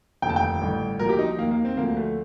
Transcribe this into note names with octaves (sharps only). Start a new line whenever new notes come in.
F1 D#2 D3 F3 G5
A5
G5
A1 G2 D3
C2 A#2 F3 A#4
G4
D#4
D#2 D#3 A#3
A#3
C4
D2 D3 F3 A#3
A3